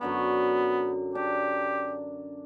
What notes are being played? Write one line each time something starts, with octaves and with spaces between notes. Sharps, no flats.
F#2 D3 B3 D6
D4 G4